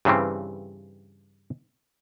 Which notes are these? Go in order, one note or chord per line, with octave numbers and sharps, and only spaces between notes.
G2 C#3 E3 G3 C4